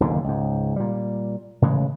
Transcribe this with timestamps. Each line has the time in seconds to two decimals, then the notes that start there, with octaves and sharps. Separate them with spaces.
0.01 F#1 D#2 A#2 D3
0.24 C#2 G#2
0.76 A#2 G3
1.62 A2 C#3 E3 G#3